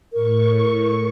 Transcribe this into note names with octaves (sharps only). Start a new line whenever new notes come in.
A2 A#4 C#6